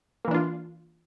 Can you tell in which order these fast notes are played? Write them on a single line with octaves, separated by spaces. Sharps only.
A#3 E3 D4 F4